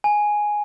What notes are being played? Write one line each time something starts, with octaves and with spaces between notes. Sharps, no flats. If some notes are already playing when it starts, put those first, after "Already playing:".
G#5